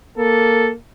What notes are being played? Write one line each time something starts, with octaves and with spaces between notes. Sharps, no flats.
A#3 A4